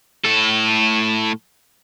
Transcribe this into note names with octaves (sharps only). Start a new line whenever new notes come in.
A2 A4